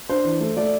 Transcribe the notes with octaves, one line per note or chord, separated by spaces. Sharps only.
D4 C5
E3
A3
A3 D5